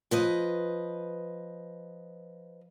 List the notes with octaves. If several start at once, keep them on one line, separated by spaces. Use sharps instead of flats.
F3 B4 D#5